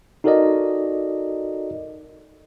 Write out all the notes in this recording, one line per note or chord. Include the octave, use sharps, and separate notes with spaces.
D#4 F#4 A4 A#4 D5 D#5